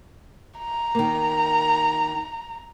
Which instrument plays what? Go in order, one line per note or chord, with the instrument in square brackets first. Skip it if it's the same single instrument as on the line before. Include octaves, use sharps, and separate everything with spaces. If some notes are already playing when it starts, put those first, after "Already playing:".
[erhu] A#5
[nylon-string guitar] D#3 A#3